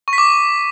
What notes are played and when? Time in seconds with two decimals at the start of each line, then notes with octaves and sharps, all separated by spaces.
0.08 C#6
0.13 B6
0.18 D6